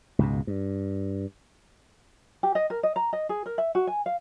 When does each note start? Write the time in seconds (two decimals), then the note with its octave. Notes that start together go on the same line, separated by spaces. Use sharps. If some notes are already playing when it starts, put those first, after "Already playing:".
0.19 C#2 G#2 B2
0.47 G2
2.43 G4
2.55 D#5
2.70 A#4
2.83 D#5
2.96 A#5
3.13 D#5
3.29 G#4
3.46 A#4
3.58 E5
3.75 F#4
3.87 G#5
4.06 F5